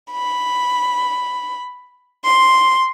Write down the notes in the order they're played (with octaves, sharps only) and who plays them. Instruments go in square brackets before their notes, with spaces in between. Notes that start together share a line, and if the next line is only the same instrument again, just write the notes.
[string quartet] B5
C6